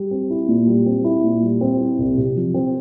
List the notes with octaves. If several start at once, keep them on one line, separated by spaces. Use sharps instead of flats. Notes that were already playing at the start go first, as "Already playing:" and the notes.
Already playing: G3
C4
E4
A#2
G3
C4
E4
A#2
G3
C4
E4
C2
C3
F3
C4